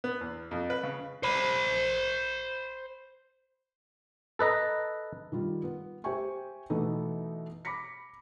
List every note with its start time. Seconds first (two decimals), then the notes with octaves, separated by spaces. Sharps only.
0.04 B3
0.21 E2
0.51 F2
0.70 B4
0.83 C#3
1.23 C5 B5
4.39 A4 B4 D#5 A#5
5.32 D#3 G3 F4
5.64 B3
6.04 G4 C5 E5 G5 G#5 C#6
6.70 B2 E3 A3 B3 D#4 E4
7.65 B5 D6 A#6 B6 C#7